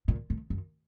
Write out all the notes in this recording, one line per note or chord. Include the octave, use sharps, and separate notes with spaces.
A#2
A2
F#2